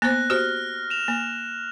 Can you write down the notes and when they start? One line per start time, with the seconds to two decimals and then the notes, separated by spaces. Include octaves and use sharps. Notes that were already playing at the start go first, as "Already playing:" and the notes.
0.02 A#3 B3 C5 F#6 A#6
0.30 F#4 G4 C5 F6
0.90 E7 F7
1.08 A#3